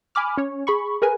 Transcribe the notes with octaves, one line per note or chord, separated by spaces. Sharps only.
G#5 B5 D6 F6
C#4 C#5
G#4 B5 C#6
G#4 A#4 B4 G#5